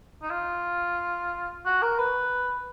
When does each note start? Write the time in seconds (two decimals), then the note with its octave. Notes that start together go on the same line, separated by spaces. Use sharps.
0.22 D#4
0.31 F4
1.66 F#4
1.82 A#4
1.99 B4